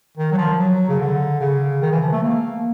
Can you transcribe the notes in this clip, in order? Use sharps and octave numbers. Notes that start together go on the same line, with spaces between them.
D#3
F#3
F3
F#3
C#3
D3
C#3
D#3
E3
F3
A3
A#3